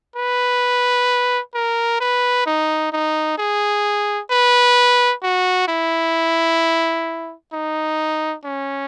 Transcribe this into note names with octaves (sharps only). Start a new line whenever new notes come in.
B4
A#4
B4
D#4
D#4
G#4
B4
F#4
E4
D#4
C#4